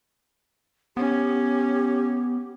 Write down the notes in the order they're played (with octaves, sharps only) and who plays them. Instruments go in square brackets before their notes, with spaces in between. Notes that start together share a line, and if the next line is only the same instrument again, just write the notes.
[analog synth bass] B3 [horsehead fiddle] C#4 [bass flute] G4